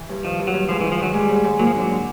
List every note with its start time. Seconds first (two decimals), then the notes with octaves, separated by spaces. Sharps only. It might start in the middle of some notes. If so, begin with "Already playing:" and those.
Already playing: E3
0.09 G2
0.24 D#3 F3
0.39 G2
0.47 F#3
0.54 G2
0.69 G#2 F3
0.81 E3
0.84 D#3
0.92 F3
0.99 D#3 F#3
1.14 G3 G#3
1.29 G#2
1.44 G#2
1.59 F#3 A#3
1.67 F3
1.74 D3 F#3
1.90 D3